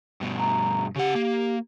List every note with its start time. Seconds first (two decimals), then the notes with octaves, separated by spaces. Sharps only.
0.21 G2 B2
0.38 A#5
0.96 C#3 G4 F#5
1.15 A#3